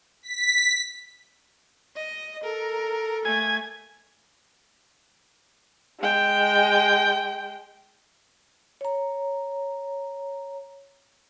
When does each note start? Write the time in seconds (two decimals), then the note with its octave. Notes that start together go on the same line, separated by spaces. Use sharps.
0.23 B6
1.96 D#5
2.44 A4 A#4
3.25 A3 G#5
6.00 G#3 G5
8.81 C#5 A#5